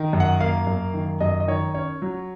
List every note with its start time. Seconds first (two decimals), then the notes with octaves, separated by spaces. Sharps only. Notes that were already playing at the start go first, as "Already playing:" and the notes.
Already playing: D#3
0.13 F#2
0.20 F#5
0.40 A#3 F5
0.67 F#2
0.94 D#3
1.21 F#2 D#5
1.40 D#5
1.48 D#3 C#5
1.74 C#4 C#5
2.02 F#3